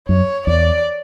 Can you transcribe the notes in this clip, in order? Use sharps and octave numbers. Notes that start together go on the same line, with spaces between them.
F#2 C#5
E2 D5